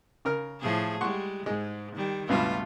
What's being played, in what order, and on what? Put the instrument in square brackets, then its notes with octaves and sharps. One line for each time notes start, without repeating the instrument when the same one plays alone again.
[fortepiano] C#3 A#4 F6
[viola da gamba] A2 F3 G#4
[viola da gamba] G3 G#3 [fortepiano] F#5 C6 C#6
[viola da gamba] G#2 [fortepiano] G#3
[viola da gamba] D#3 G3
[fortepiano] C#2 G2 B2 [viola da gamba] A3 F4